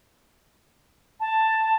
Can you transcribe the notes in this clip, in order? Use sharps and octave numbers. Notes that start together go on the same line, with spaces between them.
A5